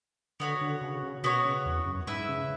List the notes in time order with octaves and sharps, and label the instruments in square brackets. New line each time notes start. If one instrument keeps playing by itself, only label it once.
[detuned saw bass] D3 [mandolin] B3 F#4 C#5
[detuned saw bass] D3
C#3
C#3
[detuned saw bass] B2 [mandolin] B3 F#4 C#5
[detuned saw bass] C#3
E2
F#2
[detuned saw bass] G#2 [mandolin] E4 B4 E5
[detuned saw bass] C#3